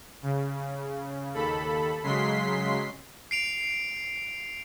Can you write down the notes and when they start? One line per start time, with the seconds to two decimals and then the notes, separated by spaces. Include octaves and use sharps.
0.22 C#3
1.34 D#2 A4 B5
2.03 C#3 F#3 G#3 C6 B6 C7
3.31 C7 D7 F7